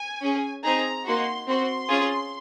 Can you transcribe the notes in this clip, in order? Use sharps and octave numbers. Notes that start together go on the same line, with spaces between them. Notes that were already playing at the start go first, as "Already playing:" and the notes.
Already playing: G#5
C#4 G#4
C4 D#4 G#4 A#5
A#3 D#4 F#4 C6
C4 F#4 C6
C#4 F4 G#4